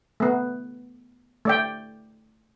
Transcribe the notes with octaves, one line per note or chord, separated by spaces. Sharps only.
A3 B3
A3 D5 G5